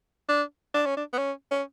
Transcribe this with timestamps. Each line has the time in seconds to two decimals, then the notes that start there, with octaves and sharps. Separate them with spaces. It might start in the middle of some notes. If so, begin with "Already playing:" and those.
0.29 D4
0.74 D4
0.86 C#4
0.97 D4
1.13 B3
1.18 C#4
1.51 C#4